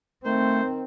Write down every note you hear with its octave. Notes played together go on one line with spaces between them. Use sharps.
D#3 A3 C4 C5